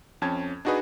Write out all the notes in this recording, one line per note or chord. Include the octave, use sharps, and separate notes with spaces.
F2 C#4 A5 G#6
D4 D#4 F#4 G#4 B4 D#5